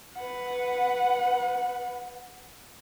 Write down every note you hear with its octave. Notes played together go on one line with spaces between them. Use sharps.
B4 F#5